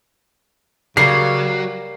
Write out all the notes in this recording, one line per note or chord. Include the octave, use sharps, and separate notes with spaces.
C#3 F#3 G3 A#3 C7